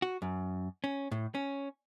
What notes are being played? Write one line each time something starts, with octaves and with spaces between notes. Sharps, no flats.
F#4
F#2
C#4
A2
C#4